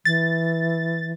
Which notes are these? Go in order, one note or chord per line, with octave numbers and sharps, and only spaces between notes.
E3 A6